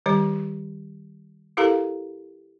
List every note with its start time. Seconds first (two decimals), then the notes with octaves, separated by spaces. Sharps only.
0.06 D#3 G3 G4 C#5
1.57 E4 G4 A4 A#4 F5 A#5